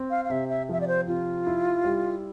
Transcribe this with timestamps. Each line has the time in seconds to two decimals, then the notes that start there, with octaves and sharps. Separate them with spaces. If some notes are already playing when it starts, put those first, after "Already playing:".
Already playing: C4
0.10 F5
0.25 F5
0.30 C3 E5
0.49 E5
0.69 F3 E5
0.81 D5
0.88 C5
1.07 C3 F4
1.46 E4
1.84 G3